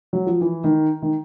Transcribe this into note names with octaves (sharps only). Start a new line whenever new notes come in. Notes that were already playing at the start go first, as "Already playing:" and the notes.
F#3
F3
E3
D#3
D#3